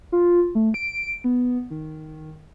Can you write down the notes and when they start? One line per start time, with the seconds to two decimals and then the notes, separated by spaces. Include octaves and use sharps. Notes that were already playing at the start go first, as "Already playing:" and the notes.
0.12 F4
0.55 A3
0.74 D7
1.24 B3
1.70 D#3